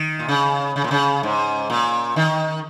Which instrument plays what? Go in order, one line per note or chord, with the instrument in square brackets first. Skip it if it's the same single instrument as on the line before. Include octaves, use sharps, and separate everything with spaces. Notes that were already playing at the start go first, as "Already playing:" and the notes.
Already playing: [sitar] D#3
A#2
C#3
C#3
A#2
C#3
G#2
A#2
D#3